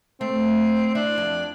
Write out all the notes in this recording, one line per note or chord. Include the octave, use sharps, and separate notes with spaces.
A3 C4
D4 E4
F2